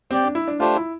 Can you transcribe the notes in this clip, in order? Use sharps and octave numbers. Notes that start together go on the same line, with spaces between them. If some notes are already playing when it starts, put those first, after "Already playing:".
C4 G4 D5 G5
D4
E4
D4
A3 D4 F4 G4 C5
E4